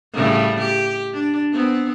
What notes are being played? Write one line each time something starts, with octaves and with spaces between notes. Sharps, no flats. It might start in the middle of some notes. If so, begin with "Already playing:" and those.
A2 C#3 G3
G4
D4
B3 C4